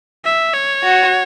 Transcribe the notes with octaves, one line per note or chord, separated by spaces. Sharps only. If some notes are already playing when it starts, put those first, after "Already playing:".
E5
C#5
F#4